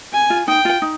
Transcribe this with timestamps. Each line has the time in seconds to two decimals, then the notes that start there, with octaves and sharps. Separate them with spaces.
0.13 G#5
0.30 F4
0.48 D#4 G5
0.65 F4
0.82 D#4